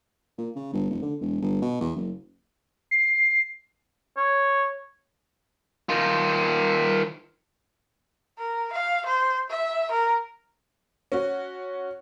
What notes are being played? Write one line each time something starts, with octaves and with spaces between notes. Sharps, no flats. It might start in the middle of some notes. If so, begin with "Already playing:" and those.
A#2
C#3
G1
F1
D3
E1
G1
B2
E2
F#1
C7
C#5
D#3 F4
A#4
F5
C5
E5
A#4
C#4 F#4